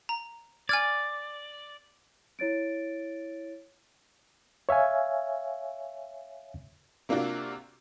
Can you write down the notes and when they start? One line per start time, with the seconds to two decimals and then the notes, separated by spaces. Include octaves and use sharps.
0.09 A#5
0.69 D5 G#5 F6 G#6
2.39 E4 C#5 A6 D7
4.69 C#5 E5 F5 G#5
7.09 C3 A#3 D4 F4 F#4